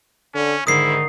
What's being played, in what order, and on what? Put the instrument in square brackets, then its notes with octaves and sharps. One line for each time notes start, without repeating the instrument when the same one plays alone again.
[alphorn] D3 [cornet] C#4
[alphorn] G#2 [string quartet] D3 D#3 [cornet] E4 [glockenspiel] D#6 C7